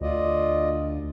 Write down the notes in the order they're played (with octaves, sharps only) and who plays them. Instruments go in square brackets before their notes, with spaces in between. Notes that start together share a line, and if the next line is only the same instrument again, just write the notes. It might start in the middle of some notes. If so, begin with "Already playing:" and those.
[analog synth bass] D2 [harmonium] F4 D5 D#5